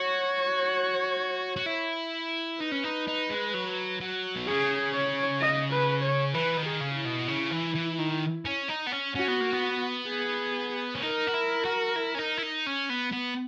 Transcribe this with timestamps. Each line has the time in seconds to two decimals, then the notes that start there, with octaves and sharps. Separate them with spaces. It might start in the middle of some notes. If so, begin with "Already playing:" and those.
Already playing: F#4 C#5
1.56 F#4
1.66 E4
2.60 D#4 B4
2.72 C#4
2.84 D#4
3.07 D#4
3.30 G#3
3.54 F#3
4.01 F#3
4.36 B2
4.48 C#3 G#4
4.94 C#5
5.40 D#5
5.72 B4
6.03 C#5
6.34 E3 B4
6.57 D#3
6.66 G#4
6.81 C#3
6.96 E4
7.05 B2
7.28 C#3
7.51 E3
7.74 E3
7.99 D#3
8.45 C#4
8.69 D#4
8.87 B3
8.92 C#4
9.15 C#4 F#4
9.28 B3
9.40 A#3
9.53 B3
10.08 G#4
10.95 C#4
11.02 D#4 A#4
11.27 F#4
11.34 E4
11.65 F#4
11.96 E4
12.14 C#4
12.18 D#4
12.37 E4
12.43 D#4
12.66 C#4
12.89 B3
13.12 B3